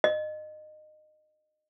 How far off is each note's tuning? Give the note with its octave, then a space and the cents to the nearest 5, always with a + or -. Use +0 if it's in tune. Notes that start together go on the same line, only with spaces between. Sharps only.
D#5 -25